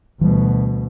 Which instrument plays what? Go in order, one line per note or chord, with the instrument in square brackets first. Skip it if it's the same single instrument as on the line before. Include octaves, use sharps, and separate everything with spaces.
[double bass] D2 B2 [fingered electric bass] E3 G3